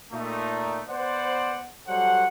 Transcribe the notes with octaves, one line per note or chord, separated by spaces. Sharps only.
A#2 A3 D#4
B3 C5 D5 F#5
F#3 G3 A4 C5 F#5